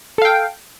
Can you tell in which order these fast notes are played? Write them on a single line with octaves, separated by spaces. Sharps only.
A4 F5 G5